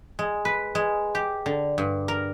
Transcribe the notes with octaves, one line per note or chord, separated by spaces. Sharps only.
G#3
B4
G#3
G4
D3
G2
A#4